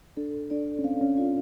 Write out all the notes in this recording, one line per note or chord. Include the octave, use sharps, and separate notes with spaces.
D4 A4
D4 D5
C#4
C4 F5
C#4
D4 F4